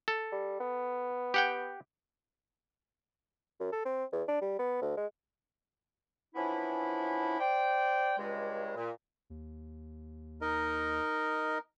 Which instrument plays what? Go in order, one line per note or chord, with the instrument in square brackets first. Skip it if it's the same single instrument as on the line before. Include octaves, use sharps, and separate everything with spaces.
[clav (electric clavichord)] A4
[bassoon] G3
B3
[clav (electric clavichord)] G4 F#5 G5
[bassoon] F#2
A4
C4
E2
D4
G3
B3
D2
G#3
[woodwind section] E3 F3 B3 C#4 D4 E4
C5 D5 G5
C#2 G2 G#3
A#2
[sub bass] D#2
[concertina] D#4 A#4 D#5